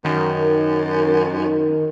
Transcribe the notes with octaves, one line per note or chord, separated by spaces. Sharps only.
F#2 D#3